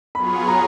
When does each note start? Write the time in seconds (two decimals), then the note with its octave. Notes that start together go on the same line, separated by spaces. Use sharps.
0.15 F#3 B3 F4 G#4 C#5 B5
0.48 A#5